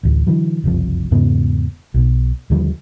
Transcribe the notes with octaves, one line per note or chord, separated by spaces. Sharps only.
A1 D2
D3 E3 F#3
F#1 C2 F2 F3
E2 G#2 C#3 B3
B1 B2
D#2 D3 F3 G3